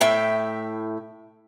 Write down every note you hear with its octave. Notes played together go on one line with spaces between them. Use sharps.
A2 E5 G5